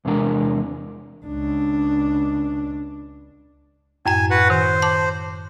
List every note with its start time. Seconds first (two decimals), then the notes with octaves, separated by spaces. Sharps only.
0.05 E2 C3 G#3 D4 A#4
1.25 C#2 D4
4.06 F#2 A2 G5 G#5
4.31 F#4 B4 F#5
4.50 D#3 C5
4.82 A5 D6